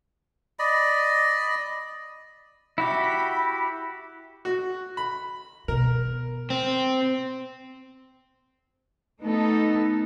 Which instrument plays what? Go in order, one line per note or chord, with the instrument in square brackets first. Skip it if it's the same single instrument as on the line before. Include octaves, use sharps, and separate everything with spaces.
[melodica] D5 D#5 B5
[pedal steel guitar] E4 F#4 G4 [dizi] B5
[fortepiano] F#4
B5
[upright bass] B2 [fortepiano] A#4
[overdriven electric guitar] C4
[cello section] A3 B3 D#4 A4